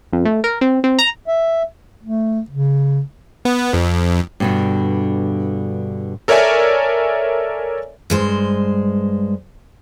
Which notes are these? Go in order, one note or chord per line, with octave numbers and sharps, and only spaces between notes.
F2
A3
A#4
C4
C4
A#5
E5
A3
C#3
B3
F2
G2 B2 D3
A4 A#4 C#5 D5 E5 G#5
G2 G#3 C5